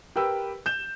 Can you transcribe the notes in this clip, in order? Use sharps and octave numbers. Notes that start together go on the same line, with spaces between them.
G4 A#4 B4 G5 E6
G6 E7